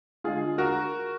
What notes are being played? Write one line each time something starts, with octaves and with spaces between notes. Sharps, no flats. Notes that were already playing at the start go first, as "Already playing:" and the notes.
D3 G#3 F4 G#4
F#4 A#4